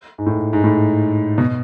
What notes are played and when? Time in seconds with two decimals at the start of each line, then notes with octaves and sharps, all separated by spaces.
0.18 G#2
0.26 A2
0.53 G#2
0.64 A2
1.38 B2